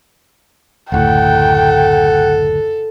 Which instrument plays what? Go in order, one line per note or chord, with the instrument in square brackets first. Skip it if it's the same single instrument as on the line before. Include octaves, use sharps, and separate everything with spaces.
[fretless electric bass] F#1 D2 A2 [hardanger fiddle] A4 [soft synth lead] F#5 [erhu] G5